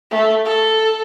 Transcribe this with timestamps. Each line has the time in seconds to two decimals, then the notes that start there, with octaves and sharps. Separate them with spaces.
0.11 A3
0.45 A4